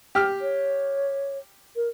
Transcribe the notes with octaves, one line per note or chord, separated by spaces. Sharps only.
G4 F6
C#5
A#4